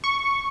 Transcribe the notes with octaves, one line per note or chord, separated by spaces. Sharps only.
C#6